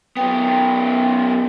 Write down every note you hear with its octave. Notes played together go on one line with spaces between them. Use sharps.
F#2 B3 G5